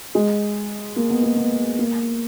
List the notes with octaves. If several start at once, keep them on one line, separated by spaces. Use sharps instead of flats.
G#3
A#3
B3
A#3
B3
A#3